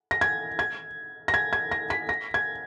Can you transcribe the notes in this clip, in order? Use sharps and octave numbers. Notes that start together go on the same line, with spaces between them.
A#6
G#6
G#6
A#6
G#6
G#6
A#6
B6
A#6
G#6